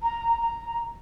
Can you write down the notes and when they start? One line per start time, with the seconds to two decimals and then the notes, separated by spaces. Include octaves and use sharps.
0.03 A#5
0.41 A#5